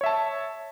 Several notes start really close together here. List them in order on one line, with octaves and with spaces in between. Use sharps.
C#5 E5 A5